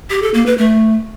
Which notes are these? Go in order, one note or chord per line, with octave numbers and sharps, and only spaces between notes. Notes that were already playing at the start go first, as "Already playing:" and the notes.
G4
A4
A#3
B4
A3